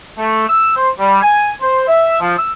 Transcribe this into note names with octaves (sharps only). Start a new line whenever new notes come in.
A3
E6
C5
G3
G#5
C5
E5
F3
E6